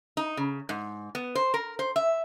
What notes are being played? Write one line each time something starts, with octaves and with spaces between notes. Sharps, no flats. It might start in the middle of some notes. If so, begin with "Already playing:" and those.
D#4
C#3
G#2
B3
C5
A#4
C5
E5